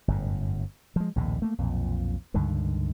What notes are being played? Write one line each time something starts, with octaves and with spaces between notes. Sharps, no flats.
G1 F#2 A2
F3 G#3
A#1 D#2 A2 C3
A3 A#3
B1 F2 A#2
C#2 G2 D3 D#3